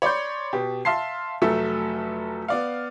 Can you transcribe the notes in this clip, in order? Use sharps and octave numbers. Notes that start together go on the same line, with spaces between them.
C#5 D5 B5 C6 G6
B2 G4
E5 F5 A5 C6 C7
F1 F#3 A3 A4 E5 E6
B3 D5 F5